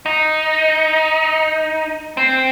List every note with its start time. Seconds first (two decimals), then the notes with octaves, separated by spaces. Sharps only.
0.06 D#4
2.17 C4